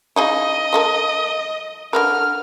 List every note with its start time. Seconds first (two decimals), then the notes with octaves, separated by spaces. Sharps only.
0.16 C#3 D#4 E4 D#5
0.73 F3 A4 A#4
1.93 D3 A#4 B4 F6